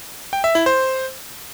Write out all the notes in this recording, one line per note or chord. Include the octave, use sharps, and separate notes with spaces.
G5
E5
E4
C5